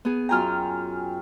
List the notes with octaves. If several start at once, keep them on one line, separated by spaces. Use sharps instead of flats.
B3 G#4
F#2 F4 G5 G#5 A#5 F6